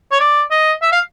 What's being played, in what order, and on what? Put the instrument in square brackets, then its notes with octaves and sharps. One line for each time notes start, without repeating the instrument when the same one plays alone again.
[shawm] C#5
D5
D#5
E5
F5